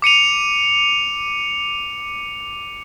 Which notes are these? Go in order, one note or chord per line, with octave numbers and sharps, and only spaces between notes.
D6 C#7 D#7 F7